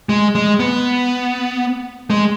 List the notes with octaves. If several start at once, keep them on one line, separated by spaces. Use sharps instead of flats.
G#3
G#3
B3
G#3